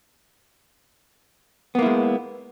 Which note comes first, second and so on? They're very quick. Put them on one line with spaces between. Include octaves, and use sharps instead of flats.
B3 A#3 E4 G#3